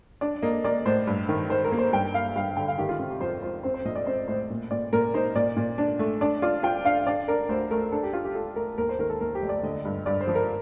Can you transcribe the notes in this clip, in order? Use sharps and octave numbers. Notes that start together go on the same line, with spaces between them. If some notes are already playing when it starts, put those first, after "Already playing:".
D4 D5
A#3 D#5
A#3 D5
A2 C5
G2
D#3
D#3 C5
A#4
A#3
C5
G2 G5
A#3 F5
G2 F5
D3 G5
F5
D#3 G4
F4
C3
G4
F2 C5
F2 C5
C4 C5
C5
A#1 D#5
D5
C4 C5
A2 C5
A#2
A#2 D5
A#2 A#4
D#4 C5
A#2 D5
A#2
D4
A3
D4 D5
F4 D5
F4 G5
D4 F5
D4 D5
D4 A#4
D2 C5
A3 A#4
D4 A4
G4
F4
G4
F4 A4
A3 A#4
D#2 A#4
C5
D#3 A#4
A4
D#2 A#4
G4
F1
D5
D3 D#5
G2
G2 D5
C5
F3
A#4